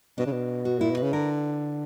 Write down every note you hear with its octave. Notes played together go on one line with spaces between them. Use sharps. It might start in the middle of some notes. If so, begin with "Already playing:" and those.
B2 D4
C#3
B2
F#4
A#2 E4
B2
B4
C#3
D3 A#4